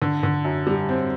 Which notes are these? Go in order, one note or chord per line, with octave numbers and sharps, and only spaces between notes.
D3
D3
F#2
G3
C4